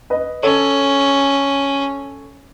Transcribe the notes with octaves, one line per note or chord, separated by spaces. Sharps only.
B4 D#5
C#4 A4 C#5